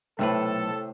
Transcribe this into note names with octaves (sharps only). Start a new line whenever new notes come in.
B1 A2 C3 A3 A4 B4